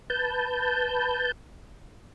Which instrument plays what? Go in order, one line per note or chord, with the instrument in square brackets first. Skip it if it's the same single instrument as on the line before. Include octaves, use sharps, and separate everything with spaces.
[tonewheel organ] B4 A5 G6